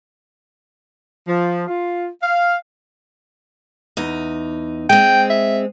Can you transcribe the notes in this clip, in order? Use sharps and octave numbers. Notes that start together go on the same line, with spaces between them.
F3
F4
F5
E2 D#4
G#3 C4 G5
E5